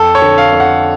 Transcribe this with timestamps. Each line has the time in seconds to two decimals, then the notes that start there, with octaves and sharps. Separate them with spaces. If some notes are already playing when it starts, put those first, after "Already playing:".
Already playing: F2 A4
0.15 C#5
0.22 D3
0.38 F5
0.52 F2
0.60 F#5